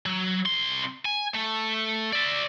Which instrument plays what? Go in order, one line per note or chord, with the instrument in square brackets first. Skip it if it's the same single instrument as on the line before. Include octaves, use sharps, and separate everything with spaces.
[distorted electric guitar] F#3
C2 C6
G#5
A3
D5 E5